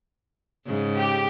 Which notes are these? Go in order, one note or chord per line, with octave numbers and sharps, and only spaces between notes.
G#2 C#3
G4